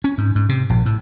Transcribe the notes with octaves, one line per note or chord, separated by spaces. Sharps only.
C#4
G#2
G#2
C3
A#1
A2